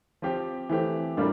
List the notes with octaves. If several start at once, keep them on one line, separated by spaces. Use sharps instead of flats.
F3 C4 G4
E3 A3 C4 G4
A2 G3 A#3 D4 F4